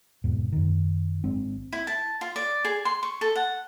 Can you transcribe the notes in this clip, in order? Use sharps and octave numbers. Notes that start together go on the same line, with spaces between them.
G#1 E2 G#2 B2
F#2 D#3
G#1 G#3 C4 D4
E4
A5
F4
D5
G#4
C6
C#6
A4
F#5